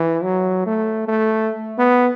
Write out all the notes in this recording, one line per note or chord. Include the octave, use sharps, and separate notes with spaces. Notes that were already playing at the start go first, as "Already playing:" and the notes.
Already playing: E3
F#3
A3
A3
B3